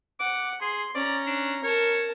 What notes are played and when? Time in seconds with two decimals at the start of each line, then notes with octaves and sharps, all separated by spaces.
0.20 F#5 D6
0.62 G#4 C6
0.95 C#4 D5 A#5
1.27 D4
1.64 A#4 C#5 A5